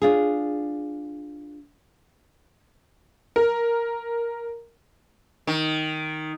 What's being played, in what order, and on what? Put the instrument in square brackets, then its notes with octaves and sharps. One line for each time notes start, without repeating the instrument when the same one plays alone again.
[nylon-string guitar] D4 F4 G#4
[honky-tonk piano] A#4
[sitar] D#3